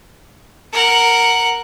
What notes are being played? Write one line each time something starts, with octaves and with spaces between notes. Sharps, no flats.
A#4 F#5